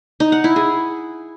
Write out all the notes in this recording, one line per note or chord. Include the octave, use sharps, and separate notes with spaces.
D#4
F#5
E4
G#4